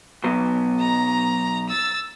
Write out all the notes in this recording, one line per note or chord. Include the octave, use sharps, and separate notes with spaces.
B1 F#3 B3
A#5
E6 A6